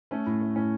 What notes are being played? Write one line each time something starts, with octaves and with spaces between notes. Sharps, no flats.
A3 C#4
A2
A3
A2 C#4